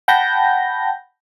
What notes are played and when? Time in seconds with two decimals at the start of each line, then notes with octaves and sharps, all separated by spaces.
0.08 F#5 G5 A5 B5 G6 A#6